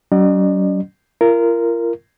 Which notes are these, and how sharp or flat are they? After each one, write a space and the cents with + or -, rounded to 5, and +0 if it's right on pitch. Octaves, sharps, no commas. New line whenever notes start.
F#3 +35 C#4 +40 D#5 -45
F4 -40 A#4 -5